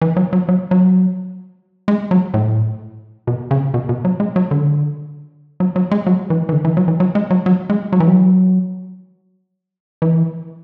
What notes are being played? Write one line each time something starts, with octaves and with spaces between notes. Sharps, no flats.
E3
F#3
F#3
F#3
F#3
G#3
F#3
A2
B2
C#3
B2
B2
F#3
G#3
F#3
D3
F#3
F#3
G#3
F#3
E3
E3
D3
E3
F#3
E3
F#3
G#3
F#3
F#3
G#3
F#3
E3
F#3
E3